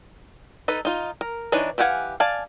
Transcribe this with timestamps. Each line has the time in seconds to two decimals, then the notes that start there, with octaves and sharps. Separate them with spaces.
0.68 D#4 A4 B4
0.85 D#4 F4
1.21 A#4
1.52 E3 D4 D#4 B4 C#5
1.78 E3 G4 F5 F#5 G#5
2.20 D5 F5 G#5 A5